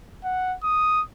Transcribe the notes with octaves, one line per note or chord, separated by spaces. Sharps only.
F#5
D#6